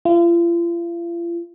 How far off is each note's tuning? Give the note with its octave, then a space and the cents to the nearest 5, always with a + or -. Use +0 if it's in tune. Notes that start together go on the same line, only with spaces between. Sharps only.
F4 -40